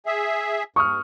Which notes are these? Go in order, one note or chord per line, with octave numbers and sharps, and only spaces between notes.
G#4 E5
G2 C#6 D#6 F6